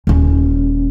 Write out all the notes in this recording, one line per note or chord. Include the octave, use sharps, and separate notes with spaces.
D#1 C#4